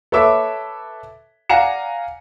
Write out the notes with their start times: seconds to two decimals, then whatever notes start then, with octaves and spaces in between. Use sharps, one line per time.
0.12 A4 B4 C#5 E5 D6 E6
1.50 D5 F5 F#5 G#5 A#5 C#7